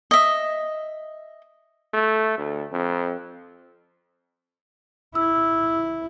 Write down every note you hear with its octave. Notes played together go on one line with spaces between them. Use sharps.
D#5 E5
A3
D2
F2
E4 E6